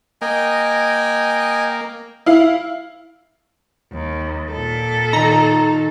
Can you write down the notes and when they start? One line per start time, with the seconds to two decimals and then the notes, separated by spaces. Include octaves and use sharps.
0.22 A#3 D#5 G5 G#5
2.26 E4 F5
3.93 D#2
4.51 A#2 A4
5.13 D#3 D#4 A#5